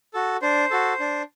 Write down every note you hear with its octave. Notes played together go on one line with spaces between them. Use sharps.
F#4 A4
D4 C5
F#4 A4
D4